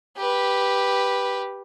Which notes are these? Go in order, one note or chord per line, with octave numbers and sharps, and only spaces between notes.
G4 B4